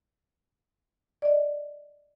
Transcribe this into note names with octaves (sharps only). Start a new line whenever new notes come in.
D5 D#5